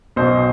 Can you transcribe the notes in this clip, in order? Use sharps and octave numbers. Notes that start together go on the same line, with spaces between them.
B1 B2 C5